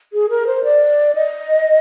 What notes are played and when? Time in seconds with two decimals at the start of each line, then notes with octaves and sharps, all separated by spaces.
0.13 G#4
0.30 A#4
0.47 C5
0.64 D5
1.15 D#5